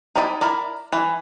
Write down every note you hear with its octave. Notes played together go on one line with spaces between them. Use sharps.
D#4 E4 D5 D#5 G#5
E4 A#4 D5
E3